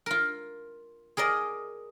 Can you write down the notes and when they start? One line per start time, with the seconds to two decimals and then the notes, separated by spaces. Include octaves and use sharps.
0.06 F4 A#4
1.17 G#4 A#4 D5 D#5